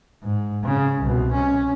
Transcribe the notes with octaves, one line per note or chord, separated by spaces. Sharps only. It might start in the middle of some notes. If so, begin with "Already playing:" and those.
G#2
C#3
C2 B2
C#4